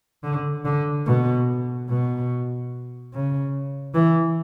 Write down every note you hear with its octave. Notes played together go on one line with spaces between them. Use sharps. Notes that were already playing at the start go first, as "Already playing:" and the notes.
D3
D3
B2
B2
C#3
E3